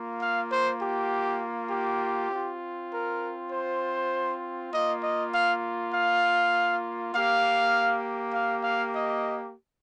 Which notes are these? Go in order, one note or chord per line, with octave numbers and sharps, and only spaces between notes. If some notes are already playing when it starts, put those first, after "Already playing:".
Already playing: A#3 F4
F5
C5
G4
G4
C4 F4
A#4
C5
A#3 F4 D#5
D#5
F5
F5
A#3 G4 F5
F5
F5
D#5